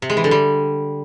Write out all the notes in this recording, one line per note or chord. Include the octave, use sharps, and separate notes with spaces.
C3
G#3
E3
D3
G3